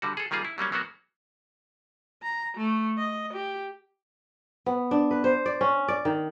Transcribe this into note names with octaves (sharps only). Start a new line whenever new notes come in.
D3 G3 F#4
G#4 A4
D#3 G3 A#3 F4 G#4
E4
F#3 G3 A#3 C#4
F#3 A#3 B3 F#4
A#5
A3
D#5
G4
B3
D4
B4
C5
D5
C#4
D5
D#3